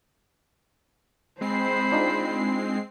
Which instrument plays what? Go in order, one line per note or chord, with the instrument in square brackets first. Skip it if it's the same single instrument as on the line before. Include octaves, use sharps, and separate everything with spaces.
[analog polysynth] G#3 C4 C7 [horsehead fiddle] C5 B5
[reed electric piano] D4 D#4 F4